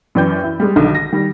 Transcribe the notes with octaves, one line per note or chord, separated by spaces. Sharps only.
F#2 E3 B4 D5 G5 G6
E4
G3 G#3
B1 D3 D#3
A#6
D#3 G3